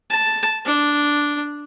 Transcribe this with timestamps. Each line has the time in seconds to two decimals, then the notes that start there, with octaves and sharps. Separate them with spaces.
0.10 A5
0.66 D4